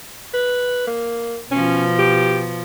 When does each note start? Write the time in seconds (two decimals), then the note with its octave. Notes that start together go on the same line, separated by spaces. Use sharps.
0.33 B4
0.87 A#3
1.51 B2 F3 C#4
1.99 G4